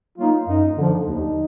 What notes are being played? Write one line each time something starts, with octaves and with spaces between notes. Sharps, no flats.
F#3 A#3 D#4 F4
F#2 D#4
D3 F3 D4
D#2 D#4